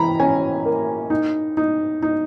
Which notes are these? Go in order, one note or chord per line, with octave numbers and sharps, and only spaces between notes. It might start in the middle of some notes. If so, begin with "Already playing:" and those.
Already playing: E3 A#5 B5
C#4 G#5
A#3
D#4
D#4
D#4